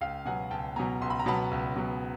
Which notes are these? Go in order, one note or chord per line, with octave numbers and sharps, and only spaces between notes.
C#2 F5 G5
B2 F#3 B3 F#5 G#5
C#2 G5 A5
B2 F#3 B3 G#5 A#5
C#2 C6
B5
A#5
B2 F#3 B3 A5 B5
C#2
B2 F#3 B3